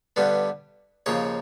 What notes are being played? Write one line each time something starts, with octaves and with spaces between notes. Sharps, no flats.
G2 D3 G3 B3
D#2 C#3 F3 C#5